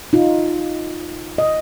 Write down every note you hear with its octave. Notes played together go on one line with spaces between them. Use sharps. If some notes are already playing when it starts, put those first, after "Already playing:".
D#4 F4
D#5